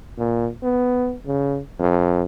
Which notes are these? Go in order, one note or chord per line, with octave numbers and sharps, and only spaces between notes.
A#2
B3
C#3
F2